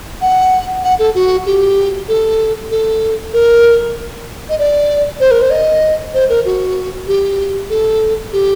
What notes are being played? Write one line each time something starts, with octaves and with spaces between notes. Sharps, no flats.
F#5
F#5
A4
F#4
G4
A4
A4
A#4
D#5
D5
C5
A#4
C5
D#5
C5
A#4
F#4
G4
A4
G4